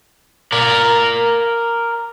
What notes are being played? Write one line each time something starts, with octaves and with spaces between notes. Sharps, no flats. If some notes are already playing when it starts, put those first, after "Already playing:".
A#4 D5